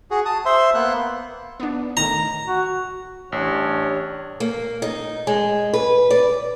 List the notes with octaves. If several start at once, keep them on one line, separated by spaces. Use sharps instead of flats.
F#4 G#4
A5 D#6
C5 E5 C6
A#3 B3 F#6
B3 D4
A2 D#3 A#5
F#4
A1 G3 D4 C#5
A#3
D#4
G#3
B4
D5